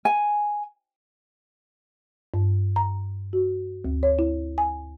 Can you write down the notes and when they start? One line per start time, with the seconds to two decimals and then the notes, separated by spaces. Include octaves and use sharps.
0.05 G#5
2.34 G2
2.76 A#5
3.33 F#4
3.85 D2
4.03 C#5
4.19 E4
4.58 G#5